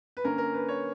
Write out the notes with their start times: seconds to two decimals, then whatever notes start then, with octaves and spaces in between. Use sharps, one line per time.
0.17 B4
0.24 D3 A#3 C#4 A#4
0.38 A#4
0.54 B4
0.69 C#5